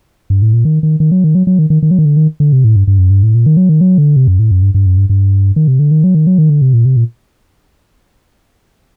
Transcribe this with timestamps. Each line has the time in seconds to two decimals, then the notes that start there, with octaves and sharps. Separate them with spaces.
0.30 G2
0.42 A2
0.53 A#2
0.65 D#3
0.83 D#3
1.00 D#3
1.12 F#3
1.24 D#3
1.35 F#3
1.47 F#3
1.59 D#3
1.70 D#3
1.83 D#3
1.91 F#3
1.99 D#3
2.05 D3
2.17 D#3
2.40 D3
2.53 C3
2.64 A2
2.76 G2
2.87 G2
2.98 F#2
3.10 G2
3.23 A2
3.35 A#2
3.46 D#3
3.57 F#3
3.69 D#3
3.81 F#3
3.98 D3
4.16 C3
4.28 F#2
4.39 A2
4.51 F#2
4.62 G2
4.74 G2
4.86 F#2
4.97 G2
5.10 G2
5.56 D#3
5.68 C3
5.79 D3
5.91 D#3
6.04 F#3
6.15 D#3
6.27 F#3
6.38 D#3
6.50 D3
6.62 C3
6.73 A#2
6.85 C3
6.97 A#2